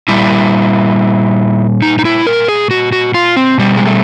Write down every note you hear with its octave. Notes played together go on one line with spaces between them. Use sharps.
A#2 G3 E4
D#4
D#4
E4
A#4
G#4
F#4
F#4
F4
C4
B2 G3
G#3
A3